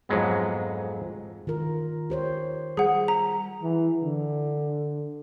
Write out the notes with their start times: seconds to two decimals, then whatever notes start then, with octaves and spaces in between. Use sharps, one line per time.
0.09 F2 G#2 F#3 G#3 B3
1.47 D#3 F4 A#4
2.10 G4 C5 C#5
2.77 G3 G#4 F#5
3.08 A#5
3.63 E3
4.04 D3